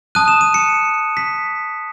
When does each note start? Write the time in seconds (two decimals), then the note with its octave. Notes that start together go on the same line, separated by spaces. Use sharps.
0.15 A5 D#6 F#6 D#7
0.28 E7
0.41 D#7
0.54 C#7
1.17 B6